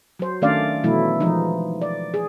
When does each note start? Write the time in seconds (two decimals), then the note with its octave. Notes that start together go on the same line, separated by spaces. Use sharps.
0.19 F#3 C5
0.42 D#3 A3 C#4 D4 D5 F5
0.84 B2 E3 F#3 A3 E4
1.20 E3 F3 G#3 D#4
1.82 D5
2.14 G#4